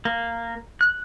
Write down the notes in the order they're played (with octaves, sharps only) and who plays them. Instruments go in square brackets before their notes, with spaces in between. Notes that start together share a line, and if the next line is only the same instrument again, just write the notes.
[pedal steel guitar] A#3
F#6